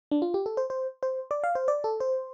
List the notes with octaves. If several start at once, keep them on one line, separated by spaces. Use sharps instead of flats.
D4
F4
G4
A4
C5
C5
C5
D5
F5
C5
D5
A4
C5